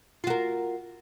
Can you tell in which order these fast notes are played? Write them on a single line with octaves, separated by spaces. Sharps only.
F4 F#4 A#4